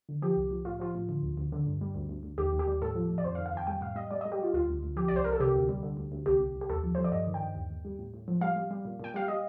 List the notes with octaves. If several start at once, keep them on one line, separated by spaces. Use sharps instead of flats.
D3
F3 G4
C2
F3
A2 F4
F3 F4
A2
D3
D2
D2
D3
G2
G3
D2
D2
D2
D#2 G4
D#2
G4
G3
A2 A4
F3
A2
D5
F2 C5
F5
D#3
F5
F2 G5
G3 G5
A2 F5
G3 D#5
G3 D5
G3 D#5
G4
G3 F4
D2 F4
D2
D2
F3 G4
C2 D5
C5
C2 A#4
A4
C3 G4
D2
G3
D3
D2
D2
C2 G4
C2
C2
G4
D#2 A4
F3
F3 C5
D5
G2 D#5
D#3
G5
G2
D#2
D#2
G3
A2
A2
F3
G3 F5
G3
G3
A#2
A#2 G5
G3 F5
G3 D#5